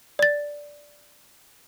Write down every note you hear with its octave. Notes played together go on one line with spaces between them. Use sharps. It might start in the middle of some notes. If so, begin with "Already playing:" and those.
D5 A6